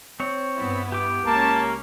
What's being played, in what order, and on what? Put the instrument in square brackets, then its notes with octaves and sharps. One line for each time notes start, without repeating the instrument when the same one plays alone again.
[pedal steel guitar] C4 C#5
[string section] G2 B3 E4
[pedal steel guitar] G4 D6
[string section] C#2 C#4 [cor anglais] A#3 [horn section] A5